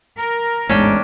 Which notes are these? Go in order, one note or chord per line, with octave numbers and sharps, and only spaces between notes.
A#4
A1 E2 G#2 G#3 C#4 D4 G5